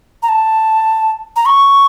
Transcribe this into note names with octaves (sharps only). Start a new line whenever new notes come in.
A#5
A5
A#5
C#6